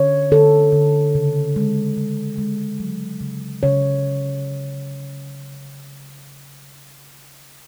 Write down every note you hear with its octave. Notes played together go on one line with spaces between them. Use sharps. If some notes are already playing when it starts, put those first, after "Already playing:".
Already playing: D3 C#5
D3 A4
D3
C#3
G#3
G#3
G#3
F#3
C#3
C#3 C#5